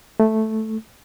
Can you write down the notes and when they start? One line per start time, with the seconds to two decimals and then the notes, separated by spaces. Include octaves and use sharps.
0.20 A3